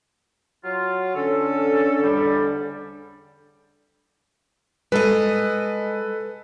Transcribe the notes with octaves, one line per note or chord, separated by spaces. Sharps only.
F#3 F4
D3 C#4 A4
E2 G#2 G3
G#3 A4 B4 D#5